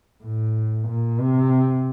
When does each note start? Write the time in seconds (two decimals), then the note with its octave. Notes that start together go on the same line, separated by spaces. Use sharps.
0.24 A2
0.88 A#2
1.20 C3